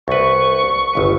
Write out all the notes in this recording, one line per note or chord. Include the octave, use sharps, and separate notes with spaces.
C2 B4 C#6
G1 C#2 B4